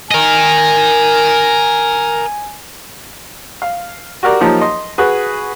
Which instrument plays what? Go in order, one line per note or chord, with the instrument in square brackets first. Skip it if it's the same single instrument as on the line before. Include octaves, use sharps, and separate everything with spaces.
[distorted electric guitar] A#4 D#5 [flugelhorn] G#5
[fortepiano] F5
F#4 G4 A#4 D5
F3 F#3 A#3 D#4 F4 G4
D#5 C6
F#4 G#4 B4